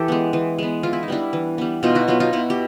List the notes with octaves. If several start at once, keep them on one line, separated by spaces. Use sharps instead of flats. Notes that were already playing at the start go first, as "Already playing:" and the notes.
Already playing: E3 G4 A4
G#3 B3
E3
G#3 B3
E3 F4
E4
D#4
G3 B3 D4 E4
E3
G3 B3
B2 D#4 F4
E4 F#4
F#3 B3 D#4 F4
D#4 F4
B2 E4 F#4
G4